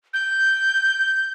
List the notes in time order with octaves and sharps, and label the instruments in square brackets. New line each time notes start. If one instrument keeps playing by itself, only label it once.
[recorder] G6